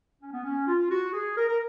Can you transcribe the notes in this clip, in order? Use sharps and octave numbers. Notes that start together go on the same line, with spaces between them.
C#4
B3
C#4
F4
F#4
G#4
A#4
A#4